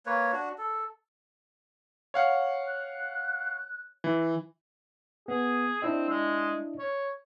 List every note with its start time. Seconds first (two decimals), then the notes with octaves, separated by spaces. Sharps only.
0.06 A#3 B4 C#5
0.33 D4 F#4
0.58 A4
2.14 C#5 F5 F#5
2.67 F#6
4.04 E3
5.28 B3 G#4
5.82 C4 D4 E4 D#5
6.09 G#3
6.79 C#5